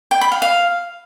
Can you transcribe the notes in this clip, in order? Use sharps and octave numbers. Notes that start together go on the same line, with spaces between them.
G5
B5
F5
F5